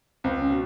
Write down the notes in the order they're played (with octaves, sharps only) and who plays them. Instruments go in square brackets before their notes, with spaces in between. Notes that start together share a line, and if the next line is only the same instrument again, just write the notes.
[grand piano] C#2 [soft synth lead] C4
[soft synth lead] C#4
[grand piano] B2